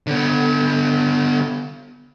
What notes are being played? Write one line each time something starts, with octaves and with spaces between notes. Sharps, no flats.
D3 B3